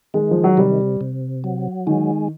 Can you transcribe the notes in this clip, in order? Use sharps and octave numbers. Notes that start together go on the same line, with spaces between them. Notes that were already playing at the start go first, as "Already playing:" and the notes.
D#3 G#3
F3
F#3
C3 G3
C3
F#3
D#3 G#3